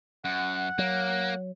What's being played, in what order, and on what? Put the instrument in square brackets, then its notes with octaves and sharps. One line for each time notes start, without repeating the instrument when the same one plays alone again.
[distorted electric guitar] F#2 [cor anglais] F#5
[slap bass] F#3 [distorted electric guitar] A#3